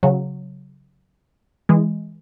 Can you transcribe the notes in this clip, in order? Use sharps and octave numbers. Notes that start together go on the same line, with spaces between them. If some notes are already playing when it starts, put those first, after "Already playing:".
C#3 F#3
E3 G#3